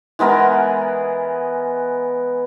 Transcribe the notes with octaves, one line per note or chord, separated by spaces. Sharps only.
E3 G#3 B3 A#4